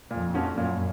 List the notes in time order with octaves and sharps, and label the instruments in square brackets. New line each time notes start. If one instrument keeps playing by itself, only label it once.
[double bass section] F2 [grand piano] A#2
[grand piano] F3 A#3 C#4 F#4
[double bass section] F#2 [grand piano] A#2